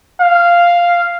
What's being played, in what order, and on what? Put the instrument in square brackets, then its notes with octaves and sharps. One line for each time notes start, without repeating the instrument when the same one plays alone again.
[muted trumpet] F5